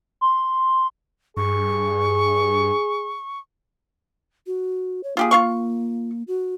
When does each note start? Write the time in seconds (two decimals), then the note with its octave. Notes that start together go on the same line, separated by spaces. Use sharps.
0.21 C6
1.37 G2 G#4 C#6
4.47 F#4
5.04 C#5
5.17 A#3 F4 G4 G#4
5.31 F4 F5 C#6
6.28 F#4